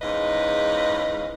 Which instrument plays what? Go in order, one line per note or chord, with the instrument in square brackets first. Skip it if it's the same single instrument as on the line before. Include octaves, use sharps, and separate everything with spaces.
[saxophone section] E2 G#2 C#4 B4 D#5 F5